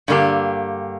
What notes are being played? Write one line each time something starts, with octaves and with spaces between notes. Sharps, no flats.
G2 D3 A#3 G4